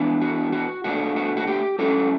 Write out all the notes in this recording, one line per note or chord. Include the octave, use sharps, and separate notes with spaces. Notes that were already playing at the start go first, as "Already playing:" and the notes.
Already playing: E3 B3 D4
F#4
F#4
B2 A3 D4 F#4
F#4
F#4
G4
A2 F#3 C#4 A4